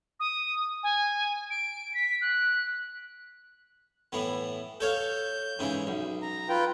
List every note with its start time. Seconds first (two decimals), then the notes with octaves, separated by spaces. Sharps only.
0.20 D#6
0.83 G#5
1.51 D7
1.94 B6
2.21 F#6
4.12 A2 E3 B3
4.80 A4 C#5 F5 G6
5.59 G#2 C#3 E3
5.87 B1
6.22 A#5
6.49 F4 B4 G5